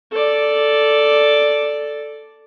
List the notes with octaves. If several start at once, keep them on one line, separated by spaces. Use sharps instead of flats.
A4 D5